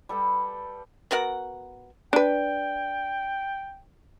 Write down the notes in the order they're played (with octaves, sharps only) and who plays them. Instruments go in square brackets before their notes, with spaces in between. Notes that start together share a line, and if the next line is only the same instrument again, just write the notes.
[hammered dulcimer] G3 A4 B4 G5
[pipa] B3 F#4 A#4 F#5
[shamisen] D4 B4 [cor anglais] G5